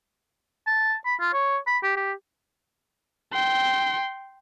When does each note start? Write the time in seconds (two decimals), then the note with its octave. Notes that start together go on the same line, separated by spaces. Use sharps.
0.67 A5
1.05 B5
1.20 F4
1.34 C#5
1.67 B5
1.83 G4
1.97 G4
3.33 G5 C6